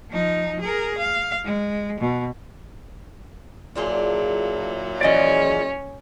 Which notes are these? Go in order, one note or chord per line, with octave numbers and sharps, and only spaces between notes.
F3 D#4
G#4 A#4
F5
G#3
B2
A#2 F#3 D4 E4 F4 G#4
E3 F3 C#4 G#4 D5 D#5